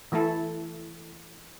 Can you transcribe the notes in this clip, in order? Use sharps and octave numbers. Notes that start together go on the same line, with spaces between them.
E3 A3 E4 A4